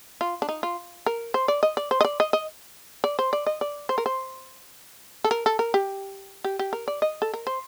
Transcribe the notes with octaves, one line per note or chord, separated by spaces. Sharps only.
F4
D4
D#4
F4
A#4
C5
D5
D#5
D5
C5
D#5
D5
D#5
D#5
D5
C5
D5
D#5
D5
C5
A#4
C5
A4
A#4
A4
A#4
G4
G4
G4
A#4
D5
D#5
A4
A#4
C5